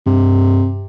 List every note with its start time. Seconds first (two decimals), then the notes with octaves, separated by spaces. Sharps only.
0.06 G2 C3